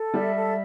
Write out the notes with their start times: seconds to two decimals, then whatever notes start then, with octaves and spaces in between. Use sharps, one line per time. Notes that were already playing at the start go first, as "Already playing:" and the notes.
Already playing: A4
0.13 G3 E5
0.35 A4